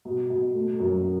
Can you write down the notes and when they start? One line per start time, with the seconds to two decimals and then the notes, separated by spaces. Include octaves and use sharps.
0.05 B2
0.30 B2
0.55 A3
0.80 F#2